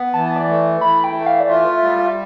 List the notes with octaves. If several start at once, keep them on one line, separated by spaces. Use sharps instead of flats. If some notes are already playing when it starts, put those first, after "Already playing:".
Already playing: B3
E3 A5
D5
A3
E3 B5
G5
A3
F5
D5
F4 E5
G3